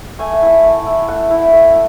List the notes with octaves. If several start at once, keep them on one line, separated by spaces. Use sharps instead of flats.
A3 G#5
F#5
E4 G#5
A3
E4
A3 F#5
E4
A3